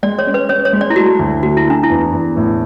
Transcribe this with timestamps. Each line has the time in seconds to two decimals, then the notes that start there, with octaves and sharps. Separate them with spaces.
0.03 G#3 D5
0.19 C#5
0.27 C#4
0.34 B4
0.49 C#4 C#5
0.65 C#5
0.73 G#3
0.81 D5
0.90 E4
0.96 A3 F#4
1.19 D2
1.43 A3 F#4
1.57 E4
1.66 A3 D4
1.83 E4
1.90 E2
2.12 E2
2.37 A2